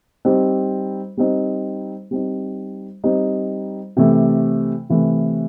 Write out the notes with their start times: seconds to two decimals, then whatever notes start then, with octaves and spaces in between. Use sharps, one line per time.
0.25 G3 C4 D#4
1.17 G3 C4 D#4
2.11 G3 C4 D#4
3.04 G3 C4 D#4
3.97 C3 E3 A3
4.90 C3 E3 A3